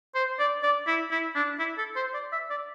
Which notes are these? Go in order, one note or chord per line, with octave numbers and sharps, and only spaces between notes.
C5
D5
D5
E4
E4
D4
E4
A4
C5
D5
E5
D5